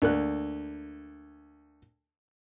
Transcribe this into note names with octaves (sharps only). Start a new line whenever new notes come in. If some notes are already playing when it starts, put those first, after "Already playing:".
D2 A#3 F#6